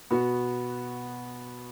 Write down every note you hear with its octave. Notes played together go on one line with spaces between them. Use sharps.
B2 B3 F#4